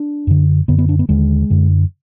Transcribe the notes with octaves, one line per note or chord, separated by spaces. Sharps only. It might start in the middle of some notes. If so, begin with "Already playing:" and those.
Already playing: D4
F#2 D3
F#2 D3 B3
B3
D4
B3
D#2 D3 G#3
F#2 D3